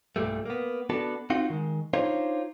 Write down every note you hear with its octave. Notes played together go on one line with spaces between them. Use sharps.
B1 G2 A#2 G3 A3
A#3 B3
B3 D4 F#4 A4
C4 D#4 F4 F#4 F#5
D#3 G#3
D4 D#4 F4 C5 C#5